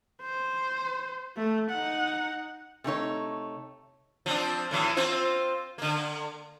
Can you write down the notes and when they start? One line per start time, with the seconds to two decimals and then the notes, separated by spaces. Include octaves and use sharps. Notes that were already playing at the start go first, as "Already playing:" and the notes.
0.22 C5
1.37 A3
1.70 D#4 F#5
2.84 C3 A3 D#4 C#5
4.26 F3 C4 D4
4.71 A2 E3 F#3
4.97 C4 F4 C5
5.78 D3 A#3